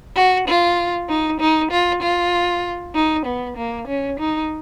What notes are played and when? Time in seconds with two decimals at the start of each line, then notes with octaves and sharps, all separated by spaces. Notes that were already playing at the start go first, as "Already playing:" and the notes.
0.15 F#4
0.47 F4
1.08 D#4
1.39 D#4
1.71 F4
2.02 F4
2.94 D#4
3.26 B3
3.57 A#3
3.87 C#4
4.19 D#4